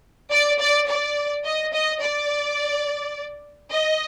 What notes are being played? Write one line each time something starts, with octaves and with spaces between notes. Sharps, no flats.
D5
D5
D5
D#5
D#5
D5
D#5